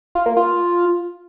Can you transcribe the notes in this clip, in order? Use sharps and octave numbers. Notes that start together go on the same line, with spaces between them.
F4
A#3
F4